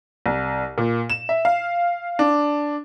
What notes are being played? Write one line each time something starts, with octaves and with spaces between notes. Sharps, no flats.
C2
A#2
E7
E5
F5
D4